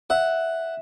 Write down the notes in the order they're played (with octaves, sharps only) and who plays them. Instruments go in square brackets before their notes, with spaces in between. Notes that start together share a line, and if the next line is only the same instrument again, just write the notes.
[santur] E5 [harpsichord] F#5